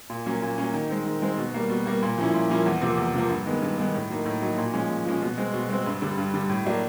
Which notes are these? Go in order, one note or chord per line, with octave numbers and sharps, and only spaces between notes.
A#2
F#3 A#3 C#4
A#2
F#3 A#3 C#4
D#3
G#3 C4
D#3
G#3 C4
B2
G3 A#3
B2
G3 A#3
A#2
F3 A#3 C#4 E4
A#2
F3 A#3 C#4 E4
E2
C3 F3 A#3
E2
C3 F3 A#3
G2
D#3 G#3 B3
G2
D#3 G#3 B3
A2
F#3 A#3 D#4
A2
F#3 A#3 D#4
A#2
F3 G#3 C#4
A#2
F3 G#3 C#4
B2
G#3 C4
B2
G#3 C4
G2
D3 G3
G2
D3 G3
A2
F#3 A#3 D4